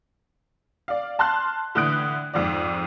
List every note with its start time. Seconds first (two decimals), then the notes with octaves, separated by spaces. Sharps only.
0.88 D5 F5
1.19 A5 C6 F6 F#6
1.75 A2 D3 E3 D#6 F#6 D7
2.34 F2 G#2 D5